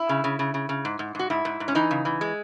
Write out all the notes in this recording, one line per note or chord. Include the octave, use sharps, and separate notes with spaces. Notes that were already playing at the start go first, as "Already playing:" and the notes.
Already playing: E4
C#3
C#3
C#3
C#3
C#3
G#2
G#2
G#2 F#4
G#2 E4
G#2
G#2
C#4
E3 D#4
C#3
E3
G#3